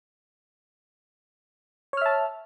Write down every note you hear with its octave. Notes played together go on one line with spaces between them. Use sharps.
C#5 E5 A5 F6